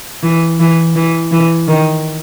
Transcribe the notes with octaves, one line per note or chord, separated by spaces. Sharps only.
E3
E3
E3
E3
D#3